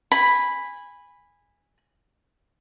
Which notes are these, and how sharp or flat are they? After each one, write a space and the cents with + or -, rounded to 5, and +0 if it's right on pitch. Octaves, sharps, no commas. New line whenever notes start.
G#5 -15 B5 +0